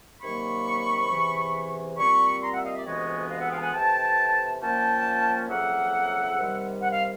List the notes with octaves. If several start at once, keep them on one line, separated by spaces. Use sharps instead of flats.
C3 D#3 F#3 A#3 B5 C#6
E2 C3 E3
A#2 G3 C4 B5 C#6
A#5 C6
E5 F#5
D#5 F5
D5 E5
D2 C3 E3 G#3 B3 C#5 D#5
D#5 F5
E5 F#5
F5 G5
A5
F#5 G#5
C3 E3 A3 G5 A5
A#2 F3 A#3 C#4 G5 A5
F2 C#3 F#3 A#3 E5 F#5
C3 D#3 G3
F#5
F5